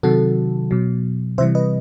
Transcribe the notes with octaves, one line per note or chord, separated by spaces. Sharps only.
C3 D#3 F#3 F#4 A4
B2 F#3
C3 E3 G3 C5 E5
B4 D#5